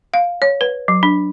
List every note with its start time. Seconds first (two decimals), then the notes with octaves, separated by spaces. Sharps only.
0.14 F5
0.42 C#5
0.61 B4
0.88 F#3
1.03 D4